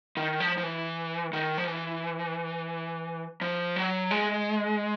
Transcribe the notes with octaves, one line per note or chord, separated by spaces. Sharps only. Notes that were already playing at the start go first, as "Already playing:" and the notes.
D#3
F3
F3
E3
D#3
F3
E3
F3
F#3
G#3